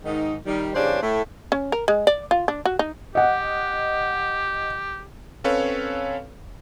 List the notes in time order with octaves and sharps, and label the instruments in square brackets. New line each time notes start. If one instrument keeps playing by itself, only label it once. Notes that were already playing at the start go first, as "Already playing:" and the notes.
[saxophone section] G#2 D#3 D#4
D#3 G3
E2 G2 C#3 D4 G4 C5
A2 A3 E4
[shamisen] C#4
A#4
G#3
D5
F4
D4
F#4
D#4
[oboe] G4 [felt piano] D#5 F#5
[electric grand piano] C4 C#4 A4 B4 C#5 F5